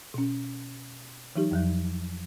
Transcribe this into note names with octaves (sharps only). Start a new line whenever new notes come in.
B2 C#4
E3 F#3 D#4 G4
F2 F3 F#3